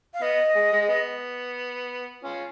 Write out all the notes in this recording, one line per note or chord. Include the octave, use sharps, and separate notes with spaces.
F5
B3 D#5
G#3
G#3
B3
C#4 F4